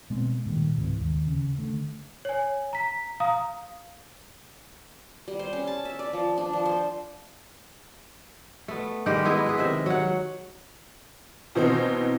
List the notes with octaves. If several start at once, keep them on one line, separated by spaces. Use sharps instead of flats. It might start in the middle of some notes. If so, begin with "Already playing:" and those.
B2 G#3 B3 C4
A#2 D#3 G3
C#2 G#2 C3 E3
D#2
C#3
D3 A3
C#5 G#5
A#5 B6
F5 A#5 D#6
G3
C5
C#4
A5
E5
D5
F3
D4
F3
C5
A3 B3
D#3 G3 G#3 G4
G#3 B3 E4 G#4
G#4 B4
C3 D#3 E5
F#3 F#5
B2 E3 C4 D#4